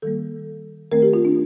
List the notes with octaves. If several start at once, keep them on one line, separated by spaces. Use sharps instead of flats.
D#3 G3 A#3 A4
D#3 A3 C4 A#4
G4
F4
D4